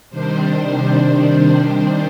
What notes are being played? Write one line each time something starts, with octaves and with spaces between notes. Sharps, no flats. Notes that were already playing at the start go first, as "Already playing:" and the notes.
C3 D#3 G3 D4 C5
C5